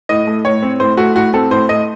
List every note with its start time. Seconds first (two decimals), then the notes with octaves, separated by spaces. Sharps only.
0.09 A2 D#5
0.27 A3
0.45 A2 C#5
0.62 C4
0.80 A2 C5
0.97 A3 F#4
1.15 A2 F#4
1.33 C4 A4
1.51 A2 C5
1.69 A3 D#5